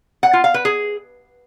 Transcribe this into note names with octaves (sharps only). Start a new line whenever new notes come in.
F#5
F4
F5
B4
G#4